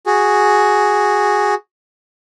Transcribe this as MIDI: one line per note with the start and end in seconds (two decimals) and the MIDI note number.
0.06 1.54 66
0.06 1.54 68